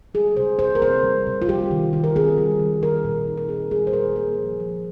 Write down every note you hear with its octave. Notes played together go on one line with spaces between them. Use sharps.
G3 G#4
C3 C5
C3 C5
A#4
C4 C5
G3
C3
F4
G3 G4
D#3
F4
A#4
C4 G#4
G3
D#3
G3 A#4
A#2
D#4
A#4
C4 G#4
G3 G#4
C5
A#2 A#4
A#3 G#4
F3
F3